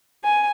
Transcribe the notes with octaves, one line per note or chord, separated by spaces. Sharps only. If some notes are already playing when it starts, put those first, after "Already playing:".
G#5